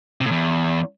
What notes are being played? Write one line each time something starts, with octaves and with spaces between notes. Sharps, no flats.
C3
A2
E2